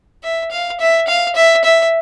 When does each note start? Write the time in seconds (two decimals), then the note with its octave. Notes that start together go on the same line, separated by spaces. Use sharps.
0.23 E5
0.51 F5
0.80 E5
1.08 F5
1.36 E5
1.64 E5